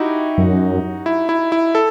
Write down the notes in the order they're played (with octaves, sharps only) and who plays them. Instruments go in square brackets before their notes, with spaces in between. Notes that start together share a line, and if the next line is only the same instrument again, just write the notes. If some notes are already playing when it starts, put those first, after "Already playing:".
Already playing: [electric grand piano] D#4 E4 F#4 G4
[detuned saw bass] F#2
[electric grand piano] E4
E4
E4
A4